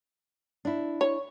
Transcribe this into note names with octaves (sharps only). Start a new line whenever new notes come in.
D4 E4
C#5